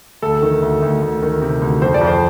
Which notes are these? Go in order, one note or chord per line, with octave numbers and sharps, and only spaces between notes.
D2 A4
D#3
D2
D2
D2
D#3
C3
D2
F2 C5
D5
F2
C5